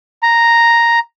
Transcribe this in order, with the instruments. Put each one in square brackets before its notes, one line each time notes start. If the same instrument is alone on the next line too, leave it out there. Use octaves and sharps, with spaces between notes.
[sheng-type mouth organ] A#5